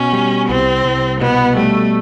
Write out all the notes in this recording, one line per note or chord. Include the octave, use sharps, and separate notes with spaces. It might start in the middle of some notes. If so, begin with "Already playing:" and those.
Already playing: B2 C#4
G3
C2 C4
C2
B2 B3
G3 A3